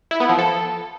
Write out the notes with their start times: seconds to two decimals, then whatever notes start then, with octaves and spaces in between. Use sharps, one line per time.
0.11 E4
0.20 B3
0.29 F3
0.38 A4